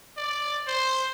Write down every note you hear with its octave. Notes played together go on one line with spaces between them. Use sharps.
D5
C5